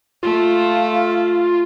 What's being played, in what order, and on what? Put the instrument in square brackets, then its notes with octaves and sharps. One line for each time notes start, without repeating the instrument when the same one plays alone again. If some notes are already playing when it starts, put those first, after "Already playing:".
[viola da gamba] A3 [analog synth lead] F4